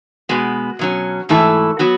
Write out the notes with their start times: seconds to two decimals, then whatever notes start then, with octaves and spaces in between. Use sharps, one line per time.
0.29 B2 G#3 B3 F#4
0.79 B2 F#3 C#4
1.29 G#2 E3 A3 E4 A4
1.79 F#3 B3 F#4